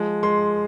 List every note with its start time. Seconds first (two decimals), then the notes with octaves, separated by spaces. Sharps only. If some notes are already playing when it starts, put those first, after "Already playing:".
Already playing: F3 G#3
0.23 G#3 C6